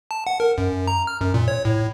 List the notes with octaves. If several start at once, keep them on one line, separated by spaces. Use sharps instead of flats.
A5
F#5
A#4
F#2
A#5
F6
F#2
A#2
C#5
A2